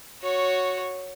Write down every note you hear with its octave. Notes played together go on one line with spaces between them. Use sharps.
F#4 C#5